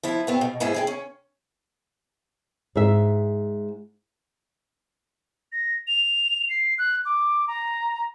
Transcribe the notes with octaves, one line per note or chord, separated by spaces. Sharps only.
F3 B3 E4
G2 B3 C4
B2
G#2 G#3 B3 E4 G#4
G#4 D5 G5
C#4
G#2 E5
A#6
F7
C7
F#6
D6
A#5